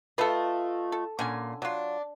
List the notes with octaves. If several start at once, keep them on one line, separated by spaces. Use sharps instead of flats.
A3 F4 A4 B4 D#5
A4
A#2 D3 C#4 G#5
F#3 D4 F4